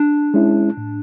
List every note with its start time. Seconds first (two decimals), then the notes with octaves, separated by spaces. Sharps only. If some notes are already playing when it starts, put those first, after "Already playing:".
Already playing: D4
0.34 G#3 C#4 E4
0.77 A2